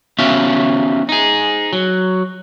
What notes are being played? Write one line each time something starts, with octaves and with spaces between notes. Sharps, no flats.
B3 C#4 F#4 G4 E5 F5
D#4 G#4
F#3